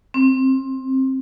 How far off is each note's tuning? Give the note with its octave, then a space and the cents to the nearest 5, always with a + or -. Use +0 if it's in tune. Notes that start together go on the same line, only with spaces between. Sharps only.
C4 +20